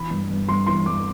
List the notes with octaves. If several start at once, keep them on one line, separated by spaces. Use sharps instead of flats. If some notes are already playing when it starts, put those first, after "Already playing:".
Already playing: E3 B5
G2
G2
G2 C6
E3 C6
G2 D6